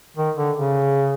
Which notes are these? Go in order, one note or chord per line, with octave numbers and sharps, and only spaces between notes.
D#3
D3
C#3